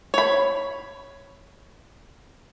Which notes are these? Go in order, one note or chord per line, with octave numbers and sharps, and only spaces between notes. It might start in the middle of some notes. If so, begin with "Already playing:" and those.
C#5 B5